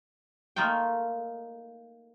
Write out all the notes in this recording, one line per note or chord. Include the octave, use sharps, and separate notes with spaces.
A3 A#3 D#4 F4 C#5 G5